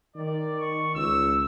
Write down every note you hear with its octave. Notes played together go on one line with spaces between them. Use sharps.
D#3 D5
C#6
C#2 E6